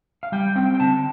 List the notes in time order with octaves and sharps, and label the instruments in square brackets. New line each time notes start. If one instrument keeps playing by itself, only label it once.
[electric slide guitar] F5
G3 G5
C4 G5
G5
D3 A5